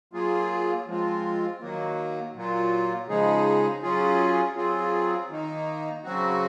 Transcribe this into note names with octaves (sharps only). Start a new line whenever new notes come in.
F#3 A#3 F4 G#4
F3 G#3 C4 F4
D#3 F#3 A#3
A#2 F#3 A#3 F4
C#3 F3 G#3 D#4 G#4
F#3 C#4 F4 G#4
F#3 C4 F4 G#4
D#3 A#3 D#4
C#3 F#3 C4 F#4